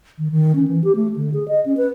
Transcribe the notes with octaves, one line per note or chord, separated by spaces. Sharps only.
D#3
D#3
C#4
E3
G4
A3
D3
G#4
D#5
C#4
B4